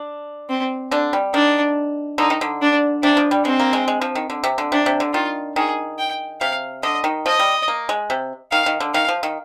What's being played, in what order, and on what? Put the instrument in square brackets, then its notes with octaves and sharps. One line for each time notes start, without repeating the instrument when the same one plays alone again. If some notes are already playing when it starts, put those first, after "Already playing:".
Already playing: [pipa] D4
[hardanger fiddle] C4
[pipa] D3 D4
G3
[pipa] D#3 [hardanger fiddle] D4
[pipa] D3 [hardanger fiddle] D#4
[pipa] D#3
D3
[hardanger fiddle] D4
[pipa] C3 [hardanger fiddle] D4
[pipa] F3
G3
[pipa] G#3 [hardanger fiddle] C4
[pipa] A#3
G#3
G#3
F3
D#3
D3
C3
D3
[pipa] C3 [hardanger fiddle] D4
[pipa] C3
D3
[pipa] D#3 [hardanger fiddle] F4
[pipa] D#3 [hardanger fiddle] G#4
[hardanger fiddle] G5
[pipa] C3 [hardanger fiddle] F5
[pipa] D3 [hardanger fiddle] D#5
[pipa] D#3
[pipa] F3 [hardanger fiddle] D#5
[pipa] G3
A#3
G#3
C3
[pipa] D#3 [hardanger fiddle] F5
[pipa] D#3
D3
[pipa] D#3 [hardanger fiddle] F5
[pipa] F3
D#3